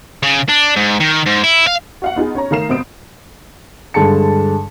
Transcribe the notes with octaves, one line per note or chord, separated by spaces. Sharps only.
C#3
D4
G#2
D#3
G#2
E4
F5
F#4 F5 F#5
B3 D#4 F4 G#4
C#4 C#5 A#5
D#3 A3 F5 A#5 C7 E7
F2 B2 B3 C5 D#6 D7
G2 D3 G#3 A5 C#7